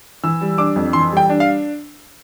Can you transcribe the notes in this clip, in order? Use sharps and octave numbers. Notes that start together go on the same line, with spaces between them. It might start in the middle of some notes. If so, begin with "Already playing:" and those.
E3 E6
G3
D4 D6
F2
E3 C6
G3
G5
D4
F5